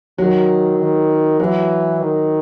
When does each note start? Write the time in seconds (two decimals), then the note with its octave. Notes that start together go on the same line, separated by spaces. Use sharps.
0.18 D#3 F#3
0.79 D#3
1.40 E3 F#3
2.00 D#3